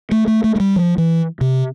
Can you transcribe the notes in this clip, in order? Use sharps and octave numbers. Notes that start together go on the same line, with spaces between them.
A3
A3
A3
A3
G3
F3
E3
C3